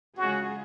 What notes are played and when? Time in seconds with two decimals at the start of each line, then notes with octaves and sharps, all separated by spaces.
0.18 C#3 G#3 C#4 F4 F#4 G#4